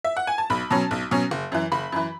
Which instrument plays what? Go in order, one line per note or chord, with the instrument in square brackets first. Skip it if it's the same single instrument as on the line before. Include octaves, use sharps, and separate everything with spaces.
[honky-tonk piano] E5
F#5
G#5
A5
B1 B5
B2 F#3 C#4 A5
B1
B2 F#3 C#4
F#1
F#2 E3
F#1 B5
F#2 E3